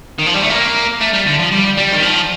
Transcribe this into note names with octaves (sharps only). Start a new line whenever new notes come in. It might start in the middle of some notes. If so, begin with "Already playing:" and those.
D#3
F3
G3
A3
A#3
A3
G3
D3
F3
G3
G3
D#3
F3